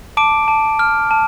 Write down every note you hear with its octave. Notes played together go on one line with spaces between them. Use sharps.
A5 D6 D7
A5
F6
A5